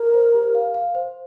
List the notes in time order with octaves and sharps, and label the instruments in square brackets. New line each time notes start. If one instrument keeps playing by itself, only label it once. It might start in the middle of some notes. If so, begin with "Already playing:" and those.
Already playing: [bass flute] A#4
[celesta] C5
G4
F5
F5
C5